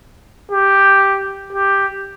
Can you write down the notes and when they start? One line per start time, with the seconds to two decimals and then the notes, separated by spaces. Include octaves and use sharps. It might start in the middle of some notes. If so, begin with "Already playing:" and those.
0.51 G4
1.52 G4